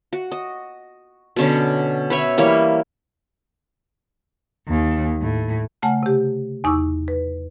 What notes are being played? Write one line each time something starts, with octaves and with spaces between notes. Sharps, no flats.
F#4
D#5
B2 D3 C#4
B4 C#5 E5
E3 G3 A#3 C#5
D#2
A2
C#3 A3 F#5 G#5 A5 F6
C3 G4
E2 D#4 C#6 D6 E6
B4